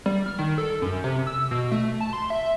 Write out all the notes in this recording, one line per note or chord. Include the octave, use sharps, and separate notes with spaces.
G3
F6
D#3
A4
F#2
C3
E6
B2
A3
A5
C6
E5